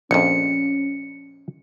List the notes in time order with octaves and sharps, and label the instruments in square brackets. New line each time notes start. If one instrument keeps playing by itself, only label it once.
[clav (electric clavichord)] A#1 F2 [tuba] C#4 [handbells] C#7